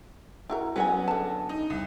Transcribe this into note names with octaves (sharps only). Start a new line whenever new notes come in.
E4 F#4 A#4
F#3 B3 C#4 B4 G5 G#5
D3 A5
D#4
C2